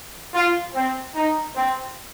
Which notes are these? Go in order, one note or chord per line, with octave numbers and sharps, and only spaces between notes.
F4
C4
D#4
C4